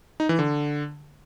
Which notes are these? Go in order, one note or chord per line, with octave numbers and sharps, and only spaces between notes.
D#4
E3
D3